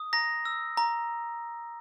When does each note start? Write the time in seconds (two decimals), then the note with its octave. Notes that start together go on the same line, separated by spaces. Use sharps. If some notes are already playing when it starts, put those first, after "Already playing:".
Already playing: D#6
0.13 A#5 A#6
0.45 E6
0.77 A#5